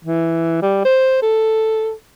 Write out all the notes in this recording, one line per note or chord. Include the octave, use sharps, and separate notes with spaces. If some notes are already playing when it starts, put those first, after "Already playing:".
E3
G3
C5
A4